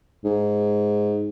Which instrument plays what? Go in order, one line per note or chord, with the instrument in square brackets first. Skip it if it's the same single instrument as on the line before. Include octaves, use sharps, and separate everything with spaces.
[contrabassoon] G#2